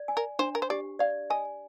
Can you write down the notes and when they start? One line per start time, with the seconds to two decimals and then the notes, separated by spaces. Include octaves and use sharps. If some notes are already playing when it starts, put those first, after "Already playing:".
Already playing: D5
0.08 G#5
0.17 A#4
0.39 D4 C5
0.55 A#4
0.62 C5
0.70 G4 D5
0.99 D5 F5
1.30 D#5 G#5